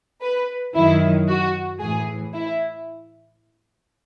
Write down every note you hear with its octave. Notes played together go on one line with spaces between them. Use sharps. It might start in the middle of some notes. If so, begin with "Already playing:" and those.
B4
F#2 D#3 F#3 E4
F#4
A2 E3 G#4
E4